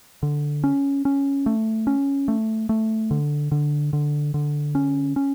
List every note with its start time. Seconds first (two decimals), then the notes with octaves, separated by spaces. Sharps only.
0.23 D3
0.64 C#4
1.05 C#4
1.46 A3
1.87 C#4
2.28 A3
2.69 A3
3.11 D3
3.52 D3
3.93 D3
4.34 D3
4.75 C#4
5.16 C#4